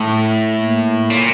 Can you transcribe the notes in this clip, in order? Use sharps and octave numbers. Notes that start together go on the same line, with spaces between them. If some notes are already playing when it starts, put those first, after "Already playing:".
Already playing: A2 A3
A#3
A#2